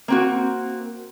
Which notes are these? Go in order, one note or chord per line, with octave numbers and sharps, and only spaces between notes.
A#3 C4 F#4